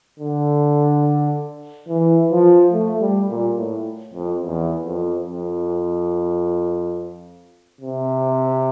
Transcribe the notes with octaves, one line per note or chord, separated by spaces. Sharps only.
D3
E3
F3
A3
G3
A#2
A2
F2
E2
F2
F2
C3